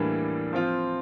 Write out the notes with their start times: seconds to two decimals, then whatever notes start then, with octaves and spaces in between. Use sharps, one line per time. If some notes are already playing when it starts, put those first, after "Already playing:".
Already playing: A2 E3 G3 A#3 D4
0.53 F3 C4 F4